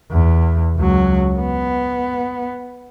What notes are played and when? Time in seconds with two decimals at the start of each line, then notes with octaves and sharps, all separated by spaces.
0.11 E2
0.76 C#2 F#3
1.40 B3